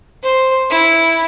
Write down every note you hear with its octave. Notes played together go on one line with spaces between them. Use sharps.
C5
E4